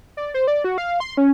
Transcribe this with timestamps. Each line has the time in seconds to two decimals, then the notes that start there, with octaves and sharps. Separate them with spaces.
0.17 D5
0.34 C5
0.47 D5
0.64 F#4
0.78 F5
1.00 C6
1.17 C#4